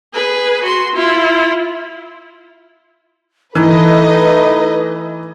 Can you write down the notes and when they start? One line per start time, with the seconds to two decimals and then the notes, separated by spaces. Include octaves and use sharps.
0.13 G#4 B4
0.63 F#4 C6
0.95 E4 F4
3.55 E3 A3 D#4 E4 A4 B4 D#5